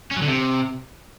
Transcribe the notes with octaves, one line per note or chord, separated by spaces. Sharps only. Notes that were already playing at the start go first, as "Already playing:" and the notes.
C#4
F#3
D3
C3